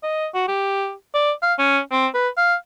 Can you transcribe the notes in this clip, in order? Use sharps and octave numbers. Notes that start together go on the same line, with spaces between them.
D#5
F#4
G4
D5
F5
C#4
C4
B4
F5